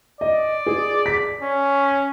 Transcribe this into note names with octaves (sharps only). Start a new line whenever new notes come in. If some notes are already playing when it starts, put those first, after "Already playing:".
D5 D#5
G#4
B6
C#4